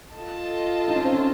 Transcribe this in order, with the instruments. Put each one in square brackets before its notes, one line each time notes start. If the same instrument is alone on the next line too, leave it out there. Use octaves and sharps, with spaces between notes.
[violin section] F4 A4 D#5 A5
[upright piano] D#4
C#4
C4
C#4